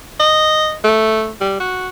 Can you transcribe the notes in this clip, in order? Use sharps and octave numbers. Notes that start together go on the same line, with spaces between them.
D#5
A3
G3
F#4